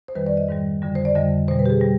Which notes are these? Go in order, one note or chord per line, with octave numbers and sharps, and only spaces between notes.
C5
F2 D#3 G3 B4
D5
D#5
G#2 D#3 G3
F2 D3 G3
C5
D5
F2 D3 G3 D#5
B2 G3 C5
B4
G4
G#4
G3